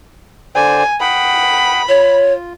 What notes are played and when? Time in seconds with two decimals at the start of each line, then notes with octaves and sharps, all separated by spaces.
0.56 D3 C5 D5 G#5
1.01 F#5 G5 B5 D#6
1.89 F4 C#5